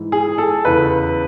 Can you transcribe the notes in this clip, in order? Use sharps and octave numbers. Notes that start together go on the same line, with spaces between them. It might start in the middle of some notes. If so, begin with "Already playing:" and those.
Already playing: G#2 E3
G#4
A4
E2 C#3 E3 B4